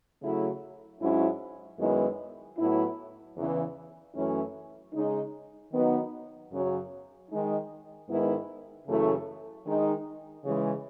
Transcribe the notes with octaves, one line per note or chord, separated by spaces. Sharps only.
C#3 F#3 A3 E4
G#2 F#3 C#4 E4
F#2 D#3 G#3 B3 E4
A2 F#3 B3 E4
E2 C#3 E3
F#2 E3 A3 C#4 E4
C#3 G#3 D#4
D#3 F#3 B3 D#4
F#2 C#3 F#3
D#3 G#3 D#4
G#2 D#3 G#3 B3 E4
F#2 C#3 E3 A3 E4
D#3 G#3 D#4
C#3 E3 G#3